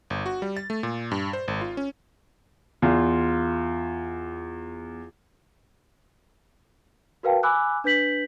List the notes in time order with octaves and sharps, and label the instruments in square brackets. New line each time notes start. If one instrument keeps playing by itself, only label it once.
[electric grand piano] G1
F#4
G3
A6
A3
A#2
G2
C5
G#1
F4
C#4
[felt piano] E2 [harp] F4
[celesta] F#4 A#4 B4 F5 G5 A5
G#5 B5 D6 E6 F#6
D4 B4 G6 B6 F#7